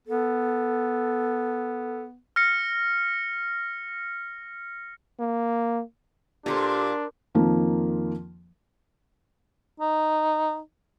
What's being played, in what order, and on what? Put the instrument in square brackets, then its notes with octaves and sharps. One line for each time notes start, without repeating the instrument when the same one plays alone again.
[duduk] B3 [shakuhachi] A4
[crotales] F6 A#6 C#7
[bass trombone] A#3
[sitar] A#2 [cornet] D4 [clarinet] G4 [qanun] A4 A#4 C5
[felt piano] F2 D#3 F3 A#3
[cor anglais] D#4